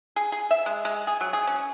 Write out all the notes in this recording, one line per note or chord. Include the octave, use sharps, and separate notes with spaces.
G#4
G#4
E5
G#3
G#3
G#4
F#3
G#4
C#4